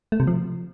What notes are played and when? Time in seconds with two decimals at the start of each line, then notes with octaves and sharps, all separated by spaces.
0.12 A3
0.20 C3
0.27 F3